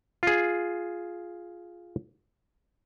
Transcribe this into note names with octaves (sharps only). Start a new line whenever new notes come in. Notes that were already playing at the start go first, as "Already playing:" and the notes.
F4 G#4